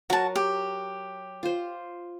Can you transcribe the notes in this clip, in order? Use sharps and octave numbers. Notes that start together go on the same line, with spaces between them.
F#3 F#4 A#4 A5
G4
F4 C5